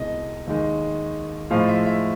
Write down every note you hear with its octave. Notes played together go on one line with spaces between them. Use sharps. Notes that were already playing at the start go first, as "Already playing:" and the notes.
Already playing: C2 B2 G#3 D#5
D#2 D#3 G#3
A2 F3 G#3 F5
E5
E5